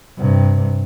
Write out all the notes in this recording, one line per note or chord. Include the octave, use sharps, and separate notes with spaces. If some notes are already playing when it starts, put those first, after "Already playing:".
G2 C3